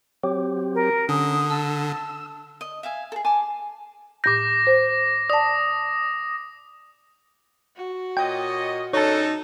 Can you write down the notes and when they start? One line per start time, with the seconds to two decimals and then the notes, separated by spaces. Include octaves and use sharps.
0.23 F#3 C4 G4
0.75 A#4
1.09 D3 C#4 D#6
1.50 A5 E6
2.61 D#5
2.83 E5 F5 G#5
3.12 G#4 A4
3.25 G#5 A5 D6
4.24 A2 D6 G6 A#6
4.67 C5
5.30 D5 A5 D#6
7.76 F#4
8.17 A#2 C#5 D#5 G5
8.93 C#3 D4 D#4 A4 C#5 A5